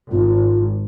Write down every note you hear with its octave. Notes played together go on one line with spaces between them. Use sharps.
G#1 F4